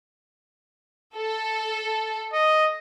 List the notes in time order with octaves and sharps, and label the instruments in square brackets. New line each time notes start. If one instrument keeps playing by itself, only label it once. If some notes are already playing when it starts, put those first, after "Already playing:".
[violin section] A4
[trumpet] D#5